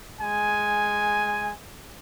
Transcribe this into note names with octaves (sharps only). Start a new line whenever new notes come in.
G#3 G#5